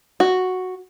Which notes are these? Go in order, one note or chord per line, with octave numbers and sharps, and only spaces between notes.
F#4